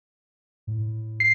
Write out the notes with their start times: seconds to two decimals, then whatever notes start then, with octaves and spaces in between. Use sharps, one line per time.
0.67 A2
1.20 C7